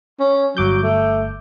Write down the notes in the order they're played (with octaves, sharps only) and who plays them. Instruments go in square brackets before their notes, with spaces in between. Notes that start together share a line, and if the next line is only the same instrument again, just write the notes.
[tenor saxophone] C#4
[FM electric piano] G1 D6 G6 [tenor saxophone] F#3
[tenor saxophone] A3